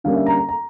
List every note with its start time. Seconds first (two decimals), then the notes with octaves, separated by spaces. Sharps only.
0.04 D3 G3 A#3 C#4 F5
0.16 E5
0.26 A#5
0.38 A#5
0.49 A#5